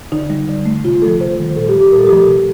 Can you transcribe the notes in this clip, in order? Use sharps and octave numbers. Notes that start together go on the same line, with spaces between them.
D3 D#4
G3
D3
A3
C3 F4
F3 A3 A4
C3 C5
D#3 G3
A#2 A4
G4
G3
G4
A#2 A#4
A4
G4
F3 A3 A4
C3